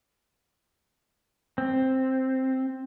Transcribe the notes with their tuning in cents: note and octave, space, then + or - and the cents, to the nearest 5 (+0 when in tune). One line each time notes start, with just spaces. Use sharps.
C4 +5